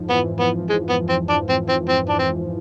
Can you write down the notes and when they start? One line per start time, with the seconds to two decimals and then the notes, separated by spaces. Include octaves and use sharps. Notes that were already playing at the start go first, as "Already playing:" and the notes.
Already playing: F2 G#2 F3
0.10 E3 B3
0.40 F3 B3
0.69 G#3
0.89 B3
1.09 C4
1.30 D4
1.49 C4
1.69 C4
1.89 C4
2.09 D4
2.19 C4